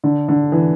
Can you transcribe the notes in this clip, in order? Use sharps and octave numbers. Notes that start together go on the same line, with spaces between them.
D3
D3
E3